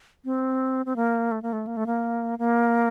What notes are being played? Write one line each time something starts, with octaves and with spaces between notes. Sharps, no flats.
C4
C4
A#3
A3
A#3
A3
A#3
A3
A#3
A#3